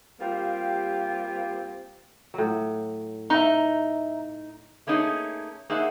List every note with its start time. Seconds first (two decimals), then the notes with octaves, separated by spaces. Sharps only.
0.20 G3 A#3 C4 F4 G4
2.34 A2 F#3
3.30 D#4 E5 A#5
4.87 A3 A#3 C#4 D#4 F#4 G#4
5.70 A#3 D#4 G#4 C5 E5 F#5